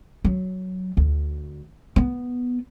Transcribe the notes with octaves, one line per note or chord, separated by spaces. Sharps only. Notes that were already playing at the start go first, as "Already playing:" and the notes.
F#3
D2
B3